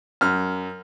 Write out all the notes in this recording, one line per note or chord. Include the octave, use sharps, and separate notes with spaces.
F#2 F6